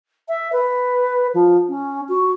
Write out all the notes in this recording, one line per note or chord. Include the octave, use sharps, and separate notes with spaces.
E5
B4
F3
C#4
F#4